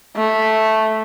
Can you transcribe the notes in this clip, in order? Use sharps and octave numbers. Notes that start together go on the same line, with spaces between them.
A3